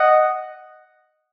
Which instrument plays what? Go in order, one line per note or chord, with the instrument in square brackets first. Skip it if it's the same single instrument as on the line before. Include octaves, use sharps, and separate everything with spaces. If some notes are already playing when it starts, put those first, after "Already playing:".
Already playing: [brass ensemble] D#5 F#5